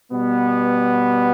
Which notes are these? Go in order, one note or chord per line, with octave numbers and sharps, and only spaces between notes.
B2 G3 B3